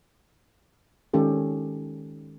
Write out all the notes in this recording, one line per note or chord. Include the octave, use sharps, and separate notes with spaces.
D#3 G#3 C#4 G4 A4